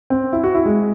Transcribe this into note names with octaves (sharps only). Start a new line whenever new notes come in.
C4
E4
F#4
E4
G#3